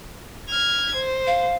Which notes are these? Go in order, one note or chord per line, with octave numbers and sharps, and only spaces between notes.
F6 G#6
C5
F5